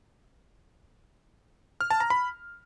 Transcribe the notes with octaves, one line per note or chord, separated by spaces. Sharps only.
F6
A5
A#5
B5